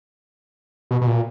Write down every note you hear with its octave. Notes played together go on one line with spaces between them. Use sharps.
B2
B2
A#2